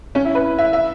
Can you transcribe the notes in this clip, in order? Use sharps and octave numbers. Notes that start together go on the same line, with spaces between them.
C#4
E4
B4
E5
E5